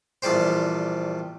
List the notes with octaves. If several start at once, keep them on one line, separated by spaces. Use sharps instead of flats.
A#1 E2 G3 G4 C5